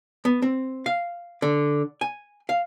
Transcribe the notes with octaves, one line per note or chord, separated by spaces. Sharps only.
B3
C4
F5
D3
G#5
F5